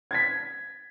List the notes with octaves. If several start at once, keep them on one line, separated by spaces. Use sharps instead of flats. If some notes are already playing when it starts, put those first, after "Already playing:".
G#6 A6 B6